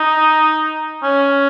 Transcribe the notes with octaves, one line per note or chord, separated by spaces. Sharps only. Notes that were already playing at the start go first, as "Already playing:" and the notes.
Already playing: D#4
C#4